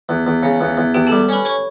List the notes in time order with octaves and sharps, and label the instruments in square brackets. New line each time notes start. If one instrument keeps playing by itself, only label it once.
[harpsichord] E2
E2
C#3
E2
E2
[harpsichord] E2 [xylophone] G4 G5
[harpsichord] G3 [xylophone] A4 A5
[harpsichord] C#4 [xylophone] B4 B5
[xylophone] C#5 C#6